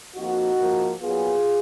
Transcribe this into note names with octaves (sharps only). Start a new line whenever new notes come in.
F2 F3 A#3 D#4 F#4
G#2 F3 A#3
A#2 F#3 B3 F4 G#4